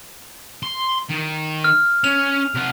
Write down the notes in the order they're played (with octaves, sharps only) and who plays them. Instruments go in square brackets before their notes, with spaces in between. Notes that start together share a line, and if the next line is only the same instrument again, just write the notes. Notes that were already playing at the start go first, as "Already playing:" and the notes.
[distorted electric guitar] C6
D#3
[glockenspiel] F6
[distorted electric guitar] C#4 [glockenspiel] F7
[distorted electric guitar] C3 F#5